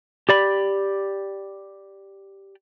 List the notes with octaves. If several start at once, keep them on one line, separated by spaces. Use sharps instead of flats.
G4 D5 B5